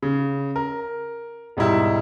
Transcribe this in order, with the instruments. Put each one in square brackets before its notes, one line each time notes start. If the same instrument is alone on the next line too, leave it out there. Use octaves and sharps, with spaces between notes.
[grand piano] C#3
A#4
E1 G#2 G3 E4 E5